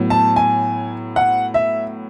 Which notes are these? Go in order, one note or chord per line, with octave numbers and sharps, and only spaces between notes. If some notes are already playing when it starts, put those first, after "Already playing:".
Already playing: A2 F#3 B3
A5
G#5
F#5
E5